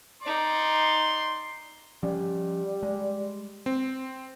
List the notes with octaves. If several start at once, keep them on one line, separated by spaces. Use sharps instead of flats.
D#4 D5 C6
F3 G3 C#4
G#3
C4